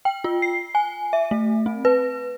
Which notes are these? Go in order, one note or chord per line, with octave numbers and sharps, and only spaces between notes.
G5
F4
C7
G#5
E5
A3
C4
B4